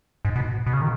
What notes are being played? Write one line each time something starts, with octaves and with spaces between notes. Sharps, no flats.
G#2
B2
B2
C#3
D#3